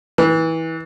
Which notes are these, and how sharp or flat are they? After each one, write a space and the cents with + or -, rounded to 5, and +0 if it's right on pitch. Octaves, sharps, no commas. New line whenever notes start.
E3 -25